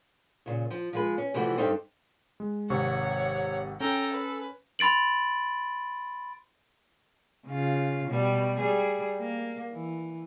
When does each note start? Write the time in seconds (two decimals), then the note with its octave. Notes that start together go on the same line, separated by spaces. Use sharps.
0.46 A#2 C#3
0.70 F3
0.93 F3 G#3 B4
1.18 C#4
1.34 C3 E3 F3 G3 A3 F#4
1.57 G2 G3 C4 D#4 A4 C5
2.40 G#3
2.70 G#1 C3 C#5 F#5 C#6
3.80 C#4 A4 G5 A#5
4.13 B4
4.79 B5 C6 A6 D7 F#7
7.47 C#3 F4
8.08 B2 G3
8.59 G3 G#4
9.19 A#3
9.72 E3